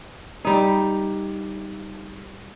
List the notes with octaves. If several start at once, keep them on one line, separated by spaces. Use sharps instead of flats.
G3 D#4